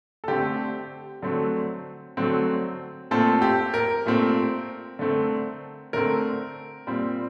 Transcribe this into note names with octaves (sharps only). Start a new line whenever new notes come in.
A4
D3 A3 C4 G4
D3 F#3 A3 C4
D3 F#3 A3 C4
A#2 A3 C4 A4
G4
A#4
A#2 A3 C4
D3 A3 C4
D3 A3 C4 A#4
A#2 G3 C4